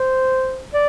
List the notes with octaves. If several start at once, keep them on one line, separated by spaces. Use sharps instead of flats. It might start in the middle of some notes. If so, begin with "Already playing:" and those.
Already playing: C5
D5